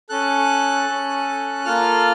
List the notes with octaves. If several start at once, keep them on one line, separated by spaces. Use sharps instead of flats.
C#4 A4 F#6
C#4 A4
A#3 F4 A4 F6